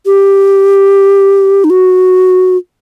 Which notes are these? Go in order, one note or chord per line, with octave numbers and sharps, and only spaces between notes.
G4
D#4
F#4